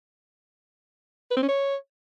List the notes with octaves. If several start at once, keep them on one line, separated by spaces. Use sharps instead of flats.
B4
C4
C#4
C#5